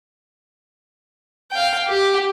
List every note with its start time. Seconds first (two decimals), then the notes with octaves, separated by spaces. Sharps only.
1.51 F5 G5
1.88 G4